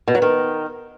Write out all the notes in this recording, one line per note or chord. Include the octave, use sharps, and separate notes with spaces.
B2
F#3
D#3